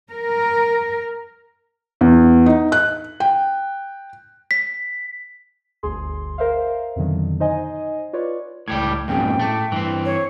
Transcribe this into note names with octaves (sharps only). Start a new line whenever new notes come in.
A#4
E2
D#4
F#6
G5
B6
G1 D2 G#4 C6
A#4 C5 E5 F5
F2 B2 D3 D#3 F#3
D#4 C5 D#5 G#5
F4 B4 C#5 D5
C#2 A2 G3 G4 G#6
F2 G#2 B2 A#3 C#4 G#4 G5
A2 A3 A5 D6
G2 E3 C4
C#5